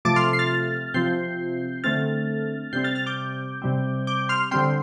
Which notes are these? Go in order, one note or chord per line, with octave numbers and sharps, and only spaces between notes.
C3 F3 A3 A5 D6
C6 F6
C7
F6 A6
C3 F3 C4 G6 C7
D3 A3 C4 F6 A6
C3 G3 C4 G6 C7
F6 A6
F6 A6
D6 G6
C3 G3 C4
D6 G6
C6 F6
D3 G3 C4 G5 C6